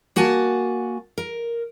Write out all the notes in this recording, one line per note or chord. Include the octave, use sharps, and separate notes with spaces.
A#3 F#4 F#5 G#5 A5
A#4